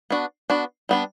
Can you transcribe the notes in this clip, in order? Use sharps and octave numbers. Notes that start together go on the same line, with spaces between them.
B3 D4 F#4
B3 D4 F#4
G3 B3 D4